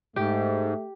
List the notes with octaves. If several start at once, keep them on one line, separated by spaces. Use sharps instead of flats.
G#2 A3 G4